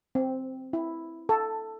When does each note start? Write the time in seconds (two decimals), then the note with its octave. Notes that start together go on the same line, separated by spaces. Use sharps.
0.15 C4
0.73 E4
1.29 A4